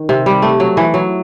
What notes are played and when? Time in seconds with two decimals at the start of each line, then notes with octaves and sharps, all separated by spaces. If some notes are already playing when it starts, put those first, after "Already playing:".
Already playing: D#3
0.09 C3
0.26 G3
0.42 A3
0.60 F#3
0.77 E3
0.94 F#3